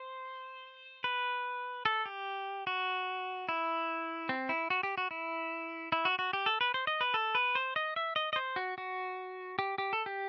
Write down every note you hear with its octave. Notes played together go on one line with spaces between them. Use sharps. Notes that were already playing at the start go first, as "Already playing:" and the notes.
Already playing: C5
B4
A4
G4
F#4
E4
C4
E4
F#4
G4
F#4
E4
E4
F#4
F#4
G4
A4
B4
C5
D#5
B4
A4
B4
C5
D#5
E5
D#5
D#5
C5
F#4
F#4
G4
G4
A4
G4